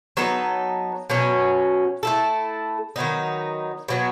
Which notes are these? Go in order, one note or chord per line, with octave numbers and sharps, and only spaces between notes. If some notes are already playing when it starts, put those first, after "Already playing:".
F#3 B3 D#4 A4
B2 F#3 C#4
A3 E4 A4
D#3 F#3 B3 D#4
B2 F#3 B3 F#4